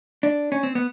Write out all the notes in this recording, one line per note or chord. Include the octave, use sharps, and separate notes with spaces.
D4
C#4
C4
B3